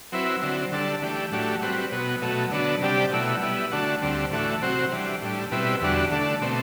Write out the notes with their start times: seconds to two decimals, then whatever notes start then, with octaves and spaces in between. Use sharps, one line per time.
0.12 F#3 C4 E4 B4
0.41 D3 F#3 C4
0.72 D3 G3 D4 A4
1.02 E3 A3 D4 G4
1.32 A2 F#3 A3 D4 G4
1.62 G3 C4 F#4 B4
1.92 B2 F#3 B3
2.22 B2 F#3 A3
2.51 D3 F#3 B3 D4
2.81 C3 G3 D4 G4 D5
3.12 B2 F#3 A3 E4
3.42 G3 B3 E4
3.71 D3 A3 D4 F#4
4.02 D2 D3 G3 C4
4.31 A2 E3 A3 D4 F#4
4.61 C3 F#3 C4 F#4 C5
4.92 E3 G3 D4
5.22 A2 G3 D4
5.51 B2 G3 C4 E4 B4
5.81 E2 D3 G3 D4 F#4
6.11 D3 A3 D4
6.42 B2 A3 C4